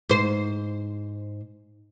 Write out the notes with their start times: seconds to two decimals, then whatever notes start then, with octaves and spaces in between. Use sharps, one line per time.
0.09 G#2 C5